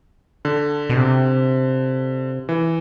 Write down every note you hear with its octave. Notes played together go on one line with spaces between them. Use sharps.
D3
B2
C3
E3